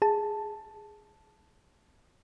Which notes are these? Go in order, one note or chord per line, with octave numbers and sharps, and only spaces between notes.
G#4 A5